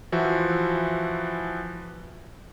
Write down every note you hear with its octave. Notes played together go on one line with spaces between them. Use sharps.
E3 F3 F#4 E5